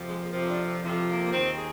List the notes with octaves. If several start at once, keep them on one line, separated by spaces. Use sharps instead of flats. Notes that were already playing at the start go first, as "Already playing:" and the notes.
Already playing: F2 C3 F3
G#3
A#3
F2 C3 F3 C4
D4
C4
F2 C3 F3
A#3
A#3
D#2 D#3 C4
G#4